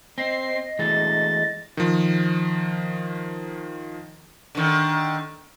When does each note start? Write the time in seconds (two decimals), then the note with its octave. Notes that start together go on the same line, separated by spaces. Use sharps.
0.18 C4 D#5 C7
0.79 E3 G#3 A3 A6
1.77 D#3 F3
4.55 D3 D#3